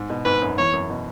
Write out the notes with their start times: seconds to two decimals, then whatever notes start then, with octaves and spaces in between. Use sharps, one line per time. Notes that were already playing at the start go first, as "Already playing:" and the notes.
Already playing: G#2
0.10 B2
0.25 G#2 B4
0.42 F#2
0.58 E2 C#5
0.73 F#2
0.90 B2